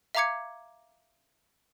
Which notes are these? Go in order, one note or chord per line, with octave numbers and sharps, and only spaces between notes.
E5 F5 A#5 D6 G#6 C#7